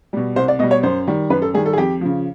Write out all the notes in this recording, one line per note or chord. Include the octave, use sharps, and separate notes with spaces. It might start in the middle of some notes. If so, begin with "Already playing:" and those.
B2 G3
C2 C5
D5
B2 G3 D#5
C#5
F#2 C5
D#3 G3
F#2 B4
A4
D#3 G3 G#4
A4
G#4
F2 G4
C#3 F3